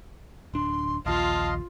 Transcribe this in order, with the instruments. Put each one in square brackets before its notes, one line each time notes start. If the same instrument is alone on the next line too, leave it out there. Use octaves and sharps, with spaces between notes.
[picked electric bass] D1 D4 [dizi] C6
[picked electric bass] A#1 D#2 [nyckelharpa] F4 [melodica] D#5 F5 C6 [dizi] A5